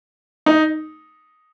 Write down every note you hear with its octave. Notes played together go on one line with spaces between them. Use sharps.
D#4